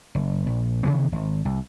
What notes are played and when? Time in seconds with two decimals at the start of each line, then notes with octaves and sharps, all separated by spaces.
0.15 F#1
0.47 A#1
0.83 C3 D#3 E3 B3
1.12 G#1
1.45 C2